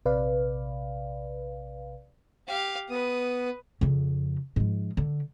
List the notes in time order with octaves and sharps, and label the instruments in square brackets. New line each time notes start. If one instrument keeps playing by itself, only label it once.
[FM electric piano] A#1 C3 B4 D5 F5
[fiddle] G4 F5
[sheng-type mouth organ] B3 [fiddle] B4 D#6
[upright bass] F2 C#3
G#2 F3
D3